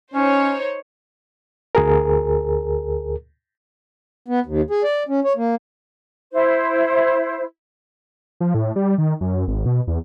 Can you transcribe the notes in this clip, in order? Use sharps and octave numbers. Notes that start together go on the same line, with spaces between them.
C#4 D#4 C5 C#5
D2 G#4 A#4
B3
D#2
G#4
D5
C#4
C#5
A#3
E4 C5
F3
A2
G3
D#3
F#2
G#1
B2
E2